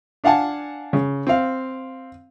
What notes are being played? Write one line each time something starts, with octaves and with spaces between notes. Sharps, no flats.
D4 F5 F#5 G#5 A5
C#3
C4 F5